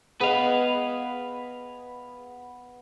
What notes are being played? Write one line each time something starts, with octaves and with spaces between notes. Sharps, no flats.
B3 G#4 B4 D#5 F5